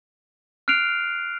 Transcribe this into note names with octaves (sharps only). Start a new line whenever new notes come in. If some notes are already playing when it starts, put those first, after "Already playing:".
F6 F#6 C7 D7 F7